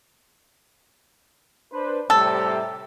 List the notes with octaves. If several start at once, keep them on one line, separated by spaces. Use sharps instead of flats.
D4 B4 C5
A2 C3 G3 A4